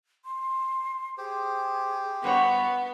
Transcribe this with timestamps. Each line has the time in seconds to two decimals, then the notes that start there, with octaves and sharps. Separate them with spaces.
0.25 C6
1.18 G4 G#4 C5
2.24 G2 B3 F#4 C#5